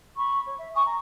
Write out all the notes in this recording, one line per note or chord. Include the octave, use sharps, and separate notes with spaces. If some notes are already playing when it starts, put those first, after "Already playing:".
B5 C#6
C#5
E5
G#5 C#6 D#6
A#5